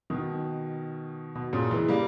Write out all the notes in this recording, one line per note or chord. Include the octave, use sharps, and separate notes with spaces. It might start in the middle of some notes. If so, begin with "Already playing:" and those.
B2 D#3
B2
A#2 C#3
E3 G#3
G3 A#3